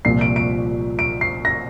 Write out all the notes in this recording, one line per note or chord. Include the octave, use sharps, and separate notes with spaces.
C2 A#2 F3 C7
D7
D7
D7
C7
A#6